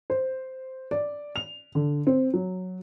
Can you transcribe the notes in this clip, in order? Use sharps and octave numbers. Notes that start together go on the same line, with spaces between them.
C5
D5
F7
D3
C4
F#3